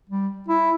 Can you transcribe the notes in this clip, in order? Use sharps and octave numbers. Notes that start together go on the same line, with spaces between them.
G3
E4